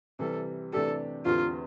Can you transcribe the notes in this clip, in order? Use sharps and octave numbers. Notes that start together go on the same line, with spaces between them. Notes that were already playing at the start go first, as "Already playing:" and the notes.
C3 E3 G3 A4
C3 E3 A3 D4 G4 A4
E2 D3 A3 C4 F4 G4